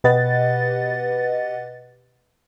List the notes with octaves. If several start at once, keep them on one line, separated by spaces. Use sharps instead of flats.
B2 G4 B4 D#5 F#5 A6